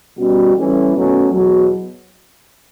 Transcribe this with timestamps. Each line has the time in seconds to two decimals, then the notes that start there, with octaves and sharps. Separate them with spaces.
0.19 B2 G3 C#4 F#4
0.56 A2 E3 G3 C#4 E4
0.94 B2 F#3 A3 C#4
1.31 E2 B2 F#3